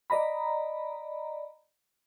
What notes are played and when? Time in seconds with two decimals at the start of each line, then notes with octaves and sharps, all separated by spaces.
0.10 D5 D#5 A#5 B5